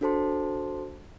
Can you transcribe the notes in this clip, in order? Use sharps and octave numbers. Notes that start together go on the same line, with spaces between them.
D4 F#4 A4 C5 A5 C6